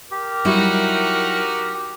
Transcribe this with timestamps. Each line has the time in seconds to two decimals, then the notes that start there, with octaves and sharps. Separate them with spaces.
0.11 G4 A#4
0.45 F#3 G3 D#4 E4 F#4